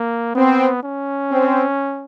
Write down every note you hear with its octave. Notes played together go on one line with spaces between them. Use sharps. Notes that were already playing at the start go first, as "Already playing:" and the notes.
Already playing: A#3
B3 C4
C#4
C4